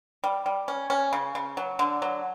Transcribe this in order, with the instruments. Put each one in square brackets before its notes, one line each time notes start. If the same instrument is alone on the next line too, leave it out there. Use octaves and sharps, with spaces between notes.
[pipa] G3
G3
C#4
C#4
C#3
C#3
F#3
D3
F#3